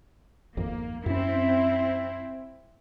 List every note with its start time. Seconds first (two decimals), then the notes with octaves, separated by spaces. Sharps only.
0.57 G#1 F2 A#3
1.06 F#2 C4 C#4 E4